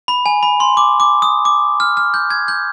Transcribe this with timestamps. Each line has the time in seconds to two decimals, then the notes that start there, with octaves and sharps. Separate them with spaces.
0.08 B5
0.26 G#5
0.43 B5
0.60 C6
0.77 D6
1.00 D6
1.22 D#6
1.45 D6
1.80 F6
1.97 F6
2.14 G6
2.30 G#6
2.48 G6